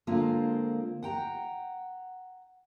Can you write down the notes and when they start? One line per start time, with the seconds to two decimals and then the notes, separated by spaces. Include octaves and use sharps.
0.07 D3 G#3 A#3 C4 F4 D5
1.03 F#5 G5 A#5